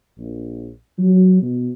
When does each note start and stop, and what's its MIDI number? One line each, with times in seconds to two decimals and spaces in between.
0.17 0.69 34
0.98 1.39 54
1.42 1.70 47